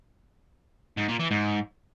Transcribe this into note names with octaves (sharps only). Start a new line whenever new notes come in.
G#2
A#2
E3
G#2